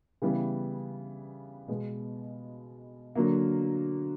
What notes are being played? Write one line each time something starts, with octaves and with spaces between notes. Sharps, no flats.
C#3 E3 G3 B3
B2 G#3 B3
D3 F#3 A#3